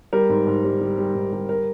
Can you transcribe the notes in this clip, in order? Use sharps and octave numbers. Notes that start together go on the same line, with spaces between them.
G3 A#4
G#2
G#2
G3
G3
G3
G#2
G3
A#4